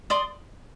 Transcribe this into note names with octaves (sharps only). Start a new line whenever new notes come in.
D5 C6 D#6